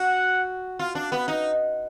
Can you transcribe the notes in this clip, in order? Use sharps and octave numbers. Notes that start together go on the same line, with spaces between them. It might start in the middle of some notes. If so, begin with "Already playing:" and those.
Already playing: F#4 F#5
F4
D4
B3
D#4